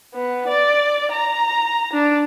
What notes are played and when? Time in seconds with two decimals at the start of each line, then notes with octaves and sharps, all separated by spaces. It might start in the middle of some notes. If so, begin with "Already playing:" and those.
0.14 B3
0.48 D5
1.13 A#5
1.93 D4